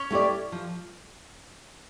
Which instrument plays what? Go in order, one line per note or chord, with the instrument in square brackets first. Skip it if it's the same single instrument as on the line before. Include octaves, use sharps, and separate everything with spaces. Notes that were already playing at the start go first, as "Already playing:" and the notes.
Already playing: [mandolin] C#4 C#5
[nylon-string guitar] A3 E4 G4 D5
F3